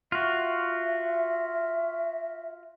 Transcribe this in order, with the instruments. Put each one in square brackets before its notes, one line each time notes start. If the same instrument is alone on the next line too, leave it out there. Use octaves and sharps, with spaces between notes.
[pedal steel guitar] F4 F#4 [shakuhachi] E5